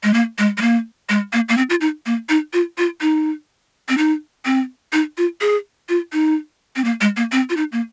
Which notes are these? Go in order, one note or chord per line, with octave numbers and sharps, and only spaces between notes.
G#3
A#3
G#3
G#3
A#3
G#3
A#3
A#3
C4
F4
D#4
A#3
D#4
F4
F4
D#4
C4
D#4
C4
D#4
F4
G#4
F4
D#4
C4
A#3
G#3
A#3
C4
F4
D#4
A#3